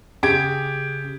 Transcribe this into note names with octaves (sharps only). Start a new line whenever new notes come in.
C#3 G4 G#4 G#6 D7